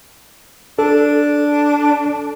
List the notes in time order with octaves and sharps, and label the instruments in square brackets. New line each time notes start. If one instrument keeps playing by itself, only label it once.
[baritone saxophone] D4 [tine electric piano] A4